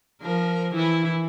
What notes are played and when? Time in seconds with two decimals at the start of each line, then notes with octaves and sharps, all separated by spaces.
0.22 F3 A#4
0.75 E3 E4